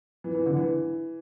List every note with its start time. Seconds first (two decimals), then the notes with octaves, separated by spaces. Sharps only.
0.24 E3
0.35 E3
0.46 D3
0.57 E3